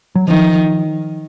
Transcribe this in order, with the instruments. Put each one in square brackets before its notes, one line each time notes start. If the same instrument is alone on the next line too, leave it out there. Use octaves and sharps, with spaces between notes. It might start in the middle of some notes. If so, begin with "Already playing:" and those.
[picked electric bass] F#3
[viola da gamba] D#3 [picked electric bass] F3